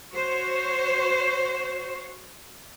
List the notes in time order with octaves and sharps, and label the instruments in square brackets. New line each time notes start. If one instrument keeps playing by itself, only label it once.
[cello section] F#4 C5 C#5